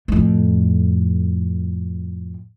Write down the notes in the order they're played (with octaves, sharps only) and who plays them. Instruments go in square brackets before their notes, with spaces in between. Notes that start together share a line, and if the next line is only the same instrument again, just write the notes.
[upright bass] F2 A2